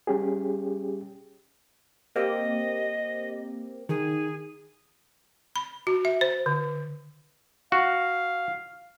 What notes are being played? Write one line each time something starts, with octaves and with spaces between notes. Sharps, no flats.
G3 C#4 G4 G#4
A#3 C4 G4 D#5
D#3 G#4
B5
F#4
E5
C5
D3
F#4 F5